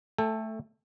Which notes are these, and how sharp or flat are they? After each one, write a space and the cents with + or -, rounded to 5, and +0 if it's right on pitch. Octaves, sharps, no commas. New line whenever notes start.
A3 +0 A4 +5 G5 +35